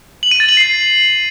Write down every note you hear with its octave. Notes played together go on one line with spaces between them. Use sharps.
F#7
D#7
A6
F#7
C7